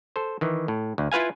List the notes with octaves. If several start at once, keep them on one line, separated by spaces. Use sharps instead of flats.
A4 C5
D#3 E3
A2
D2
E4 F4 B4 F5 G#5